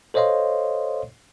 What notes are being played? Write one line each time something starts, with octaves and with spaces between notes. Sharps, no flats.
A4 C5 C#5 D#5 F5 C6